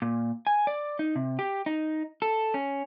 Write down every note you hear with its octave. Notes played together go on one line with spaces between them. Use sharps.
A#2
G#5
D5
D#4
C3
G4
D#4
A4
C#4